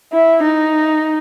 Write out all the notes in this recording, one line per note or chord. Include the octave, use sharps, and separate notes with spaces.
E4
D#4